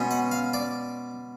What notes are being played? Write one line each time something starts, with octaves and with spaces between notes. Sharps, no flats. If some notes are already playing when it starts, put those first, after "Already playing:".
Already playing: B2 G#3 C#4
F#5
F5
D5